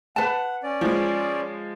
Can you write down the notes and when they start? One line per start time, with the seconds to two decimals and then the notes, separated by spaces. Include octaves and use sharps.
0.16 B4 F#5 A5
0.63 C#4 D5
0.81 F3 G#3